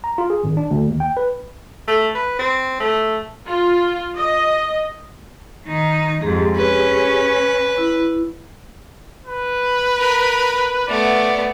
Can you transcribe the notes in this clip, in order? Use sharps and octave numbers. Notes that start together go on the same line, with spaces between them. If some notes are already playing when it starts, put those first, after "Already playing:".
A#5
F4
G#4
G#1
D4
D2
D#2
G5
B4
A3
B4
C4
A3
F4
D#5
D#3 D#4
F2 G#2 G4 G#4
C#4 B4
E4
B4
A#4 B5
A3 B3 D5